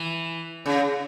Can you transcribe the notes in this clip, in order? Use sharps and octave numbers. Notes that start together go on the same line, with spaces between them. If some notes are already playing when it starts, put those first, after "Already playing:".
Already playing: E3
C#3